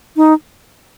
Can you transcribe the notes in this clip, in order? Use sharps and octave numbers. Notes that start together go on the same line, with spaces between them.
D#4